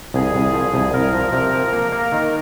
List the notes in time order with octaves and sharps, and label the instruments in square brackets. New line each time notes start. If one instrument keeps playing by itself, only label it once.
[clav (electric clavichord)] C2 [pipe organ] G#4
[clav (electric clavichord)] C2
F3
C2
[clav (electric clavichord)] C2 [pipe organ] A#4
[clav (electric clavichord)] F3
C3
F3
A#3
A#3
D#3